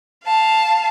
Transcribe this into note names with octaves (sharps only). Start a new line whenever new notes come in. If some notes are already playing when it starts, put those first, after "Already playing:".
F5 A5